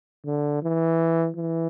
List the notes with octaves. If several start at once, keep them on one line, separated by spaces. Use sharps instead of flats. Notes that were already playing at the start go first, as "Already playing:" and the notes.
D3
E3
E3